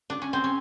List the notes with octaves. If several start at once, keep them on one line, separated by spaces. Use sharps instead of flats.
D4
C#4
C4
C#4